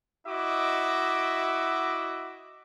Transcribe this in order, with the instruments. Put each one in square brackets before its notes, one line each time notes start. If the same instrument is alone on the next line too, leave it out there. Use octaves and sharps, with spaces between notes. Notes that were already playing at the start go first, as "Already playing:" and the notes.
[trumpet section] E4 F#4 D#5 E5 D6